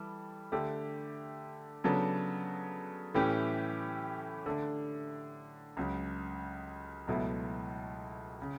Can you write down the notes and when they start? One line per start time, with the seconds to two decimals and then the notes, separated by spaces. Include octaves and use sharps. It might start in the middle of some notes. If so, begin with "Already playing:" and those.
Already playing: E3 G3 A4
0.52 D3 A3 D4 G4
1.84 C#3 F#3 B3 D4 A4
3.14 A2 E3 A3 C#4 G4
4.46 D3 A3 D4
5.77 C#2 C#3 F#3
7.07 C#2 B2 F#3 A3 E4
8.42 C#3